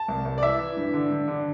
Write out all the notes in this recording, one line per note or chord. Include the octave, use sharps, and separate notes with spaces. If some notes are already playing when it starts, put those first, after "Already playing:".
Already playing: A5
C2
C2
D5
E3 E5
E3
G2
D3
G2
D3